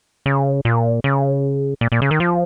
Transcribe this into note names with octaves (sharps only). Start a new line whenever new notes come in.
C#3
A#2
C#3
A#2
A#2
C#3
D#3
F3